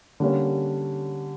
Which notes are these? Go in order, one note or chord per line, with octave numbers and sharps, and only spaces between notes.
D3 G3 A#3 C#4